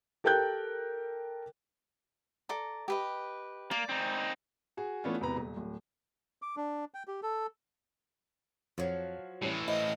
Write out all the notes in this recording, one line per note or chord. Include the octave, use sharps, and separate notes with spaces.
G4 A4 A#4 G5 F#6 G6
A4 D5 A#5
G4 B4 D#5
A#3 D5
C4 D#4
F#4 G#4
E3 A3 B3 C#4 D4 F4
E1 E2 C3 B4 A#5
D#1
D1
D6
D4
G5
G4
A4
F2 F3 F#3
A2 E3 G3 C#4
F3 E4 D#5